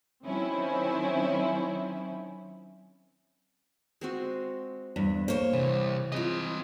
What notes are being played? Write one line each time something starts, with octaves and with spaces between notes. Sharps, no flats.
D#3 F#3 C4 C#4 E4
G#3 C4 F#4
E2 G2
A#3 C5 C#5
C2 E3
G#3 C4 F4 D#5